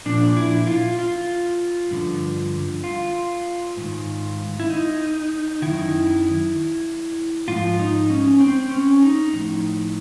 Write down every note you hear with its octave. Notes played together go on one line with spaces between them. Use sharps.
A#2 F3 D4
E4
F4
F4
G2 D3 F3
F4
G#2 D#3
E4
D#4
F#2 D#3 E4
G#2 F3 F4
D#4
C#4
C4
C#4
D#4
A2 F3